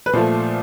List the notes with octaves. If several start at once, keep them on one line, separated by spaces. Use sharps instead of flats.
B4
A#2 F3 A3 C5